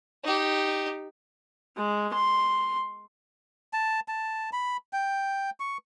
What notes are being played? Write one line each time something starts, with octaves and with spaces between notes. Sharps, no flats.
D#4 G4
G#3
C6
A5
A5
B5
G5
C#6